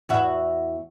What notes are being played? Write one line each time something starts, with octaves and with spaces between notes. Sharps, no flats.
E2 F#4 E5